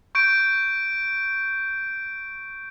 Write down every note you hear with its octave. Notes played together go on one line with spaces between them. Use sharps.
C#6 G6 D7